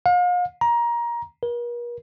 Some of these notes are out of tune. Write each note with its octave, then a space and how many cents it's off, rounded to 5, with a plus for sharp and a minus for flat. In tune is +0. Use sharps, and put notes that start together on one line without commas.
F5 +40
A#5 +20
A#4 +45